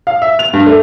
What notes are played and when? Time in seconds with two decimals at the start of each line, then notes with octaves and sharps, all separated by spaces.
0.07 F5
0.22 E5
0.39 F7
0.53 G2
0.66 A3